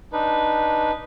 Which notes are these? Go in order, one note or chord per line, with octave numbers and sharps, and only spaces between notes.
D4 D#4 B4